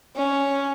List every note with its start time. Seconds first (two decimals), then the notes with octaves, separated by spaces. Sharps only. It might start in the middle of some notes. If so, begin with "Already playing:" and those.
0.16 C#4